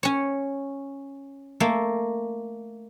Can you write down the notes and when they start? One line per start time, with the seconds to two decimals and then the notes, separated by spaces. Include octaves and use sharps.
0.03 C#4 C#5
1.60 A3 A#3